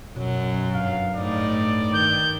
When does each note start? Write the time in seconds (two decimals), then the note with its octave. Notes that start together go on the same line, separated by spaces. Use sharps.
0.16 F#2 B2 F#3
0.74 G2 F5
1.15 A2 D#4 D5
1.94 D#3 G6